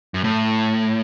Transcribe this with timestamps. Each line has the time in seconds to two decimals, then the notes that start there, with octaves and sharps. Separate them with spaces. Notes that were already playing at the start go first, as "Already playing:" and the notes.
0.14 F#2
0.24 A2